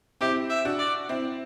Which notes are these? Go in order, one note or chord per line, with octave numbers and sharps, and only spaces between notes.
C4 E4 G4
E5
D4 F#4
D5
C4 E4